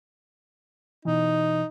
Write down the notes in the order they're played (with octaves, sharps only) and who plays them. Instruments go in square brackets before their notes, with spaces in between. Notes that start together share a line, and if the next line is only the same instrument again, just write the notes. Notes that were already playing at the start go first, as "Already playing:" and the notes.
[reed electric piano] B2 E3 [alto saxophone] D#4